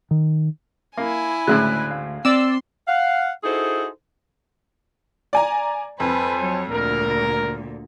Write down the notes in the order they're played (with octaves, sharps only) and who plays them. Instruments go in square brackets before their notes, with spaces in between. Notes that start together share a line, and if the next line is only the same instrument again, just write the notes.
[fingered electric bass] D#3
[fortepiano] A#3 [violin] E4 G#5
[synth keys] D2 [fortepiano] A2 C#3 G#3 [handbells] F#6
[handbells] F5
[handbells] C4 [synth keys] D5 E6 [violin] C6
[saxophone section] F5 F#5
D#4 E4 F#4 G#4 A4 C5
[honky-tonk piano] D5 G#5 A#5
[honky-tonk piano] F2 [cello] B4 [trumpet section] C5 G#5 A5
[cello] F#3 C#5
[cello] D2 A#2 [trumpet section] A#4